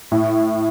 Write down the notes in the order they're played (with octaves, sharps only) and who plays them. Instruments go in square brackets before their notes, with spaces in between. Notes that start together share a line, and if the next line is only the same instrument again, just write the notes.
[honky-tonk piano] A2